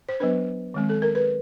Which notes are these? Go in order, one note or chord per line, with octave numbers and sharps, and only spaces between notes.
C5
F#3 B3 D4 B4
D#3 G#3 C4
A4
A#4
B4